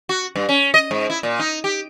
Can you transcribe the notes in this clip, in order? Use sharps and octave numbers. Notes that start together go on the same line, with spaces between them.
F#4
G2
C#4
D#5
G#2
E4
A#2
D#4
G4